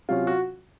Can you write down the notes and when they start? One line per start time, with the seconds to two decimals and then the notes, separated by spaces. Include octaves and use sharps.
0.09 C3 F#3 C#4 F4
0.27 F#4